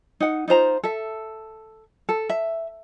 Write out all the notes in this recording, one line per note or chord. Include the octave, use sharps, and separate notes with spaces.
D#4 F#5
D#4 F4 C5 A#5
A4 E5
A4
E5